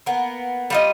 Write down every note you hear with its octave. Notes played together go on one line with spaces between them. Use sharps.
A#3 B3
G3 F4 D#5